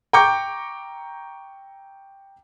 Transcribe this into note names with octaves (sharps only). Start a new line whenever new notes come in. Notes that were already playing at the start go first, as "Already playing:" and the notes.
G5 A#5 C#6 D6 G6 C#7